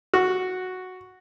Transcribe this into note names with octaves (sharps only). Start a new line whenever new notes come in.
F#4